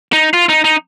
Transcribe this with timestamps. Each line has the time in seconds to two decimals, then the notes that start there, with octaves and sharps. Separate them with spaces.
0.13 D#4
0.33 F4
0.49 D#4
0.64 D#4